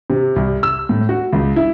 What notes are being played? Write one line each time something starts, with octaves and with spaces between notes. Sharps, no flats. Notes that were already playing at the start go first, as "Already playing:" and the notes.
C3
C2
E6
A2
F#4
C#2
E4